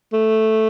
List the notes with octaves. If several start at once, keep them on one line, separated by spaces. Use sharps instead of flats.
A3